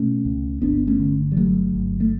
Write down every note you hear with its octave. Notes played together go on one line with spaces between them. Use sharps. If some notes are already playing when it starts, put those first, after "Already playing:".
Already playing: B2 A3 C#4
C#2
G1 B3 D4
A3 C#4
D3
G3
G1 F#3 A3
G1
A3